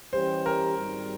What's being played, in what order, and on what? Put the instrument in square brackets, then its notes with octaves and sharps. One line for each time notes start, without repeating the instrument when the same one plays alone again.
[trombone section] E3 G3 C#4 G4 [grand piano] C5
[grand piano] A#4
[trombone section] G#1 G#2 G3